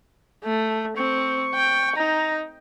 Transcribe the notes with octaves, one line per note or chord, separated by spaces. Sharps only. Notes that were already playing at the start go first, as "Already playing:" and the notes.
A3
C4 C#6
G5
D#4 A#5